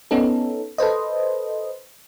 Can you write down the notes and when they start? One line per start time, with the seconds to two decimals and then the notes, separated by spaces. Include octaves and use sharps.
0.11 B3 C#4 D#4 A4
0.78 A4 B4 C5 D#5